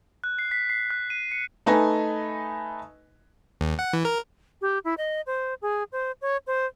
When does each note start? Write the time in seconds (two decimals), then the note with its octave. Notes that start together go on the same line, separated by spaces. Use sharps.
0.24 F#6
0.39 C7
0.51 B6
0.70 C7
0.90 F#6
1.10 D#7
1.32 C#7
1.66 A3 D#4 B4 D#5 G#5
3.61 D#2
3.79 F#5
3.93 E3
4.05 A#4
4.61 G4
4.85 E4
4.98 D#5
5.27 C5
5.62 G#4
5.92 C5
6.22 C#5
6.47 C5